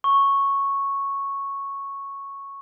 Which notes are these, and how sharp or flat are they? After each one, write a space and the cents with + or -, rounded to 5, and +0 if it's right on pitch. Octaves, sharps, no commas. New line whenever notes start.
C#6 -5